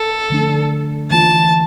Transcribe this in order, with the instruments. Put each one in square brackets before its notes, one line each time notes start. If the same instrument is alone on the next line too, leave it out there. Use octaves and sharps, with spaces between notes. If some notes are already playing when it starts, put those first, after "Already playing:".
Already playing: [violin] A4
[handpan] D3 F3 A3 D4
[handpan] E3 A#3 F4 [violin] A5